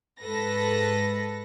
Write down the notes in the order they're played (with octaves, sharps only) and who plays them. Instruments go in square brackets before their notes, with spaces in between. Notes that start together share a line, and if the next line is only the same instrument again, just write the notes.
[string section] G#2 A4 B4 A#6